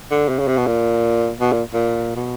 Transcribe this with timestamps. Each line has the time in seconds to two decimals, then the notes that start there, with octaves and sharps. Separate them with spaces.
0.11 D3
0.29 C3
0.39 C#3
0.48 C3
0.57 B2
0.67 A#2
1.40 B2
1.52 A#2
1.73 A#2
2.16 B2